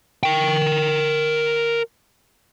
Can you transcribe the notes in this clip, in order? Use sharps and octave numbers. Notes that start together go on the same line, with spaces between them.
A#4 G5